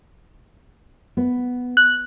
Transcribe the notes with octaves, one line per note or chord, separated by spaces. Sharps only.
B3
F#6